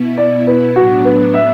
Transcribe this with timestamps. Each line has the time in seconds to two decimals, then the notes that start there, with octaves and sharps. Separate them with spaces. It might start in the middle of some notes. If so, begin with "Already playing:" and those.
Already playing: B2 B3 E4
0.18 D5
0.47 B4
0.76 A2 F#3 B3 D4 F#4
1.05 B4
1.34 E5